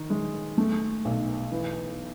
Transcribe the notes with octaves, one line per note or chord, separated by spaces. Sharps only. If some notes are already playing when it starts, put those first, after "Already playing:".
Already playing: D#3
G#3
A3
B1
E3